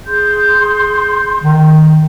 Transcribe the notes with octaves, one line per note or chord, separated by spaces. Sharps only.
G#4 C6 G6
D#3